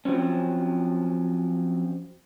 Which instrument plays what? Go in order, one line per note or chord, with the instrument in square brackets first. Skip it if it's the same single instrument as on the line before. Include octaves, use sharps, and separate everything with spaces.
[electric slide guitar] F3 F#3 C4 C#4